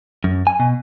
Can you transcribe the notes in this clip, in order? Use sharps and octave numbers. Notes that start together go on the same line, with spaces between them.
F#2
G#5
B2